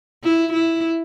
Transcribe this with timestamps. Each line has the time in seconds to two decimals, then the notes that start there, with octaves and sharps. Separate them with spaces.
0.24 E4
0.53 E4